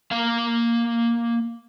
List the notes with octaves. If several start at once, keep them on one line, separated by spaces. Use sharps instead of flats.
A#3 F5